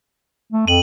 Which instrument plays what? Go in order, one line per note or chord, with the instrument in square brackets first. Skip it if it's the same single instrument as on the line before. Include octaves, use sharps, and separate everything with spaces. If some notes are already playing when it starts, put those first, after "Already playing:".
[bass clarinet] A3
[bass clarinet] F2 [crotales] D#7 F#7